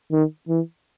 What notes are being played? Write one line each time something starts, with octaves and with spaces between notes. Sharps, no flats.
D#3
E3